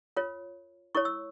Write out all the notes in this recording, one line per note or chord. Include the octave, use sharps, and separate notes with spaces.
F4 A#4 C#5
E4 A#4 C#5 C#6
E6